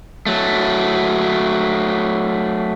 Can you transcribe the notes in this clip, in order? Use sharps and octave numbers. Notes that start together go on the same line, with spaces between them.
F#3 A3